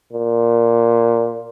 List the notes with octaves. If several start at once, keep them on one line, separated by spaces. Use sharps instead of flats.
A#2